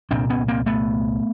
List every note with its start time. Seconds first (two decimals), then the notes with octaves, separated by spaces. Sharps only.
0.11 C2 A#2 C4 D4
0.30 B3 C#4
0.48 A#3 C4
0.66 A3 B3